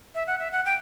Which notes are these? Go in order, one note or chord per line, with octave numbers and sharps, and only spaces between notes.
E5
F#5
E5
F#5
G5